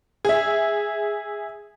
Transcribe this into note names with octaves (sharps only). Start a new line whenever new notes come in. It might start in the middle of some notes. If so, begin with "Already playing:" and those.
G#4 E5